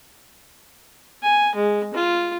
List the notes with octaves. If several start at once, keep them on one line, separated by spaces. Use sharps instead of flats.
G#5
G#3
F4